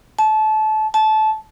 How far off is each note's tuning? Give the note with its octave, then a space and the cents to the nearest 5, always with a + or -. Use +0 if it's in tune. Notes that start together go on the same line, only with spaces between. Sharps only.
A5 -25
A5 -20